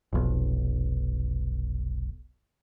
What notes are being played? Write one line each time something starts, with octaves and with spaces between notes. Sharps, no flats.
F1 B1